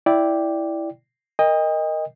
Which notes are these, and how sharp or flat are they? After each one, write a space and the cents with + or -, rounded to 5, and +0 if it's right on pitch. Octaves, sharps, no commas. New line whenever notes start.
E4 +0 D5 +0 G5 +0
A#4 +0 D#5 +0 G5 +40